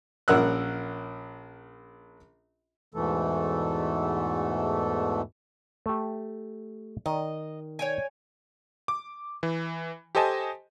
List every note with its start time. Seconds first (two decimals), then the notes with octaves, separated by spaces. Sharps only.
0.28 A#1 C#4 A#4 F#5 E6 F#6
2.94 E2 G#2 B2 E3 A3 A4
5.86 A3 G4
7.06 D#3 D#5
7.79 C#5 G5 G#5
8.88 D6
9.43 E3
10.15 G4 A4 C5 D#5 G#5 A5